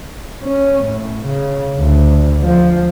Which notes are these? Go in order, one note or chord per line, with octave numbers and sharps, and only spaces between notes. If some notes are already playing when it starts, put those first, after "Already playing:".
C#4
A2
C#3
D2
F3